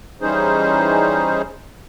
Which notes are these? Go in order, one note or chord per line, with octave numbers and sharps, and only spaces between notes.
E3 G3 C#4 D#4 G#4 C5